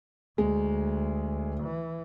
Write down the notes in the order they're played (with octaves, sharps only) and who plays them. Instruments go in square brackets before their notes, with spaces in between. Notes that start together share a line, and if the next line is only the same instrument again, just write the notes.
[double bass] D2 [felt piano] G#3
[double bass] E3